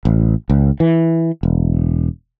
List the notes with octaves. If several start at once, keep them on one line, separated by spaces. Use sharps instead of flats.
A1
C#2
E3
E1